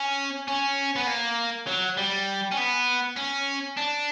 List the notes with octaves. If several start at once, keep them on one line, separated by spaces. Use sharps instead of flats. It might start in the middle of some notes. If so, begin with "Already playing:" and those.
Already playing: C#4
C#4
B3
A#3
F#3
G3
C#4
B3
C#4
D4